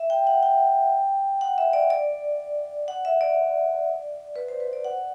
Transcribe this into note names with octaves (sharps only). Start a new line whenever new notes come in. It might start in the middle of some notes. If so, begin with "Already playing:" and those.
Already playing: E5
G5
F#5
G5
F#5
E5
D5
D5
F#5
E5
D5
B4
C5
B4
D5
F#5